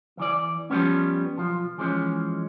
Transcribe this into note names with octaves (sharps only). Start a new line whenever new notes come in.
E2 E3 D5
F3 G3 G#3 B3 C#4
B1 F3 F4
E3 F3 G#3 C#4